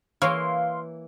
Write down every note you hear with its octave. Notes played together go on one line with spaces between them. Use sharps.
E3 A#3 C#5 F5 C6